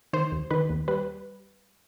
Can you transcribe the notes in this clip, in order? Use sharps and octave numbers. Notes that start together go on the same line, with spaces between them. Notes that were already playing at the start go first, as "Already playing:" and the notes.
D#3 C5
D#2
D#3 B4
D#2
G3 B4